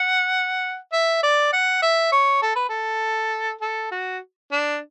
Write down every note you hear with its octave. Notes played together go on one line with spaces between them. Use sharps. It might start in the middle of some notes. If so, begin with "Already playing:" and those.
Already playing: F#5
E5
D5
F#5
E5
C#5
A4
B4
A4
A4
F#4
D4